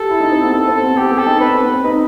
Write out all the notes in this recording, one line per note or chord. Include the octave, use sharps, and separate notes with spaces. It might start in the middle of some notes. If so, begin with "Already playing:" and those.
Already playing: G4 A4
E4
D#4
C4
B3
A4
C4
A4
B3
B3 G4
B3
A4
D#4
C4 B4
C4
B3
C4
D#4 B4